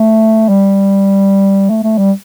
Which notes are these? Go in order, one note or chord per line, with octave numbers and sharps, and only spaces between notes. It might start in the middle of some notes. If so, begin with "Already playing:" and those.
Already playing: A3
G3
A3
A3
G3